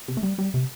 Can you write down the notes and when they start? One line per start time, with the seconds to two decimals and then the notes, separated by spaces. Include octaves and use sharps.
0.08 C3
0.17 A3
0.23 G3
0.38 G3
0.54 C3